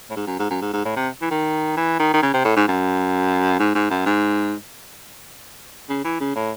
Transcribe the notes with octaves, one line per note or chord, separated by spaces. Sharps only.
A2
G#2
F#2
G#2
F#2
G#2
G#2
A2
C3
E3
D#3
E3
D#3
D#3
C#3
C3
A2
G#2
F#2
G#2
G#2
F#2
G#2
C#3
E3
C#3
A2